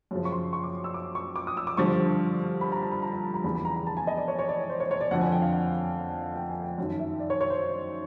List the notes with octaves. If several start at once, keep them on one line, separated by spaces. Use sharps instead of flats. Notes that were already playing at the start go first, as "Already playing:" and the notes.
F#2 C#3 F3
C#6
C6
C#6
D6
E6
D6
C#6
D6
D#6
E6
D6
G2 D3 F3 C#6
B5
A#5
A5
B5
A#5
A#5
A#5
E2 C#3 E3 B5
B5
A#5
A#5
A5
G#5
D#5
D5
C#5
C#5
D5
C5
C#5
C#5
D5
F2 D3 F3 F#5
G#5
G5
F5
F#5
G5
G#5
G5
F#2 D#3
E5
D5
C#5
C#5
C5